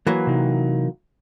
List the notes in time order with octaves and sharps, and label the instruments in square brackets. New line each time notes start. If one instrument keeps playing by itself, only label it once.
[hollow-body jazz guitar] E3 F#3 A#3 [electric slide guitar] B4
[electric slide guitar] C3 D#4